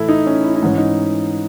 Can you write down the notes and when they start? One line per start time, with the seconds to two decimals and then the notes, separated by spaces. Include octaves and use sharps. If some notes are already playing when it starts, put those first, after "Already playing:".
Already playing: A2 E3 E4 A4
0.09 D#4
0.27 C#4
0.44 E4
0.55 D#4
0.62 G#2 E3 C#4
0.78 D#4